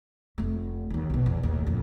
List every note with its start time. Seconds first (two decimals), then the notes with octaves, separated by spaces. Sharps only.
0.38 F1 A3
0.90 D#2 D#3
1.10 B1 B2
1.26 E2
1.43 D#2 A2
1.67 A#1 F2